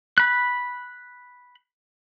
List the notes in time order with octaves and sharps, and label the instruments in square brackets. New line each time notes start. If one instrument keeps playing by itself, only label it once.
[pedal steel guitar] B5 F#6